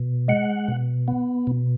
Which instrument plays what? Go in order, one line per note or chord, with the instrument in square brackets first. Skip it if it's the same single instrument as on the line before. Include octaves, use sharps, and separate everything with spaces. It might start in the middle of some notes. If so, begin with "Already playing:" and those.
Already playing: [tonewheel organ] B2
G#3 F#5
B2
B3
B2